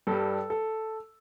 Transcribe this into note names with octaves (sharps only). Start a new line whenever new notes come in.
G2 G3 A4
A4